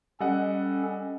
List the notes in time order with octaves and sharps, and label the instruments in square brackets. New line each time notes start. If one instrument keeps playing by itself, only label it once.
[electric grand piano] G3 D#5 F#5 [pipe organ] C#4 A4